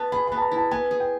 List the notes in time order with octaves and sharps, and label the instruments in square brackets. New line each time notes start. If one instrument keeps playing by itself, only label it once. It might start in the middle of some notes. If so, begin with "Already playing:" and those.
Already playing: [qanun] B3 [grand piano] A5
[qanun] G#4 [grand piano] B5
[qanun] B3 [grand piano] B5
[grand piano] A5
A#5
[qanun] E4
[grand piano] A5
[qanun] B3 [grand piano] G#5
[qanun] G#4
[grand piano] G5